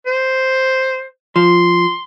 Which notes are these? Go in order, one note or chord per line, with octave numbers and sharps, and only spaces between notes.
C5
F3 C6